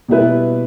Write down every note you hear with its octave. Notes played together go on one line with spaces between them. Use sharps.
B2 G3 E4 B4